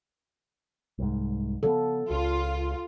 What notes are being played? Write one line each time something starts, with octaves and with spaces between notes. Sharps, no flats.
C2 G#2
C#3 F3 B3 A4
C#2 F4